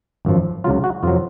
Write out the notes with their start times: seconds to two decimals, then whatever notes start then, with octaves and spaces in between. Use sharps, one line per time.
0.25 G#1 F#2 F3
0.64 C#2 C#3 F#3 F4
0.84 F#4
1.03 F2 C3 F#3 F4